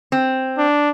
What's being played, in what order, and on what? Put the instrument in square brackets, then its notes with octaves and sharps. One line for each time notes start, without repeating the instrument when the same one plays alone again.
[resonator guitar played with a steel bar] C4
[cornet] D4